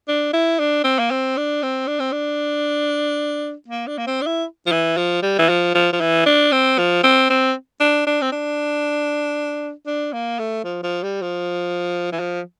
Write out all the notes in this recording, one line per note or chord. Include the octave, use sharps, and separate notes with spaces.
D4
E4
D4
C4
A#3
C4
D4
C4
D4
C4
D4
A#3
D4
A#3
C4
D4
E4
F3
E3
F3
G3
E3
F3
F3
F3
E3
D4
C4
F3
C4
C4
D4
D4
C4
D4
D4
A#3
A3
F3
F3
G3
F3
E3
F3